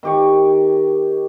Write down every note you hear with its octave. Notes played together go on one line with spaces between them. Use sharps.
D#3 G4 C#6